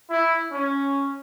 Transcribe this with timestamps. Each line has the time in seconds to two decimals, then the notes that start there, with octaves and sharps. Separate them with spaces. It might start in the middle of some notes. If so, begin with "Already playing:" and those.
0.10 E4
0.52 C#4